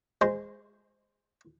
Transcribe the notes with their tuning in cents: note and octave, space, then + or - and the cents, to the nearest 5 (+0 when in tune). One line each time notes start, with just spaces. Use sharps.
G#3 -10 C5 -5